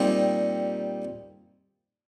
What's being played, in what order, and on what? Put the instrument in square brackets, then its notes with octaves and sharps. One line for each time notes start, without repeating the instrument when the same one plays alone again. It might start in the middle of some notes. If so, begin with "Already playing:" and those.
Already playing: [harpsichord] A#2 G3 C4 D#4 G4